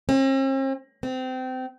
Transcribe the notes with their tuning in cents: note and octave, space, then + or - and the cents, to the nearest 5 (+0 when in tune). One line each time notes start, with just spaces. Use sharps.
C4 +45
C4 -25